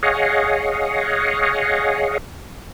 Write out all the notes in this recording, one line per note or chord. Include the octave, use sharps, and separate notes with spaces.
G#4 C#5 D#5 F5 F#5